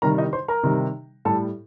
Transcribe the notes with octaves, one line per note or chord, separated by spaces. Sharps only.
C3 D#3 G3 A#4 A#5
D#4 D#5
C5 C6
A#4 A#5
C3 D#3 G3
A2 G3 A4 A5